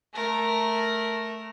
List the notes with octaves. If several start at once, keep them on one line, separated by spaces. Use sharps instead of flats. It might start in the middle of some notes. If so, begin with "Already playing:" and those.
A3 A#4